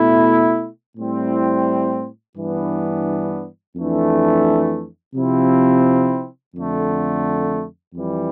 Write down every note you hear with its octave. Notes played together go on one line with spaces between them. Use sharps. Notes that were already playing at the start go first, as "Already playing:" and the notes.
Already playing: B2 A3 E4
A2 G3 C4 E4
G2 E3 B3 D4
F2 E3 A3 D4
C3 F3 C4 E4
F2 D3 A3
F2 E3 G3